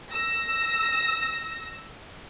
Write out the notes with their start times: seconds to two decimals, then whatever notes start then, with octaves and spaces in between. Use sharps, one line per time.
0.11 E6 A#6